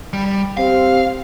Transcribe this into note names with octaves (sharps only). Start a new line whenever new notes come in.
G3
C4 G4 F5